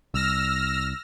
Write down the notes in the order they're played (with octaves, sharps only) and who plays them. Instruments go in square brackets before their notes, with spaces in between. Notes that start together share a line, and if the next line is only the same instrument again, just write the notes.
[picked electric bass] C2 [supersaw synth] E6 F6 A#6